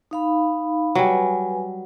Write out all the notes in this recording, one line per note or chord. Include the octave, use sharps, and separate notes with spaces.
D#4 F5 B5
F#3 G3 B4 G#5